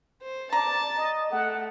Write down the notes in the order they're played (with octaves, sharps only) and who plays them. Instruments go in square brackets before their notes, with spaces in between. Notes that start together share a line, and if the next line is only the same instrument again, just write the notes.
[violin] C5
[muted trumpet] D5 [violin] A5 [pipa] A#5
[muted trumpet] D#5
[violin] A3 [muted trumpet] F#5